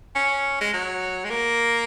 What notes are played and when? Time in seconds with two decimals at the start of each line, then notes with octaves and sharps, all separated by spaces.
0.15 C#4
0.61 G#3
0.73 F#3
1.25 G#3
1.30 A#3